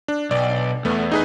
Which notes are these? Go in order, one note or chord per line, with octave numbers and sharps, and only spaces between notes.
D4
B1 D5
E2 A3 B3
D#4 G#4 B4